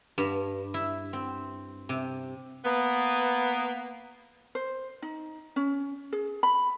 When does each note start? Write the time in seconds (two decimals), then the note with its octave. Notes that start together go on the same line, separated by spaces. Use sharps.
0.18 G2
0.74 E4
1.13 C4
1.89 C3
2.65 A#3 B3
4.55 C5
5.02 D#4
5.56 C#4
6.13 G#4
6.43 B5